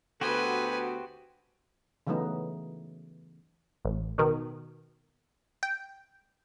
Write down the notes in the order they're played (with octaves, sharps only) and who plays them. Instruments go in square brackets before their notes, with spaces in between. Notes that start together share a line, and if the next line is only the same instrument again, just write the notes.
[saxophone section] D2 B3 A4 [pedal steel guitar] F#4 G4 C5 [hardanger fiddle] B4 G#5
[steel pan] C#3 E3 F#3 A3 B3 D#4
[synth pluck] A1
B2 D#3
G5